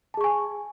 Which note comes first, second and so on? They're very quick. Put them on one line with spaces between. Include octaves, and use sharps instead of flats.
A5 G#4 C#6 G#5